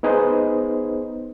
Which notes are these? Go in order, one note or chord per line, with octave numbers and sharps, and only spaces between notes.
B3 D#4 G#4 B4 C5 D#5